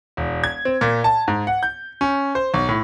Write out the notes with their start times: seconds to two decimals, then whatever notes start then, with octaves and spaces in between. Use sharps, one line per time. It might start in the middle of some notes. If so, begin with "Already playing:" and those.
0.17 E1
0.44 G#6
0.65 C4
0.81 A#2
1.04 A5
1.28 G#2
1.47 F#5
1.63 G6
2.01 C#4
2.35 C5
2.54 B1
2.68 A2